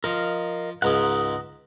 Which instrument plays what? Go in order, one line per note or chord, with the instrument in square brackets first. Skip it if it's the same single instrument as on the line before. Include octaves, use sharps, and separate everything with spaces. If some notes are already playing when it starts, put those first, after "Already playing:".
[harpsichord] F3 [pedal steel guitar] A#4 D#5 F5
[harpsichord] C#2 G#2 C#3 [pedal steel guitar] F#5 A#5 D#6